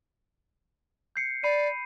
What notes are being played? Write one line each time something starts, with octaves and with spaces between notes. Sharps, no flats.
G6 C7 C#7
D5 B5 C7 D#7